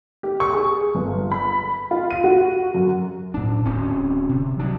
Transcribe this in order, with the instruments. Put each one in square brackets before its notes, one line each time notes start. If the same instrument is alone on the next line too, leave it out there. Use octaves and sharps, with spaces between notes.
[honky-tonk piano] G4
C#6
G#4
G1
B5
F4
D#7
F#4
F#2
[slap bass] A2 D4
D1 C4 C#4
C3
D2 F#3 D4